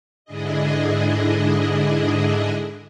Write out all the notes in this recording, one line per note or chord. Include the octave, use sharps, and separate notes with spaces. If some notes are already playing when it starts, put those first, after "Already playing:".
G#2 D3 D4 E4 G#4 D#5